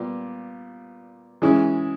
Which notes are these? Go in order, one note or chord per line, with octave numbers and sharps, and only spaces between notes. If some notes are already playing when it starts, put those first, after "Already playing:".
Already playing: A#2 G3 B3
E3 G#3 C#4 E4